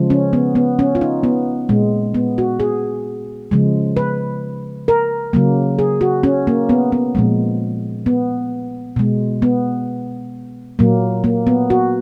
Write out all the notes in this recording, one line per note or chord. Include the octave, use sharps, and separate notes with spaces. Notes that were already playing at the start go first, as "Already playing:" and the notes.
Already playing: C#3 F3 G#3
C#4
B3
B3
C#4
F4
D#4
B3
A#2 G#3
B3
F#4
G#4
C#3 F3 G#3
B4
A#4
C#3 F#3 A#3
G#4
F#4
C#4
A#3
B3
B3
A#2 F3 G#3
B3
B2 G#3
B3
A#2 F#3 A#3
A#3
B3
F#4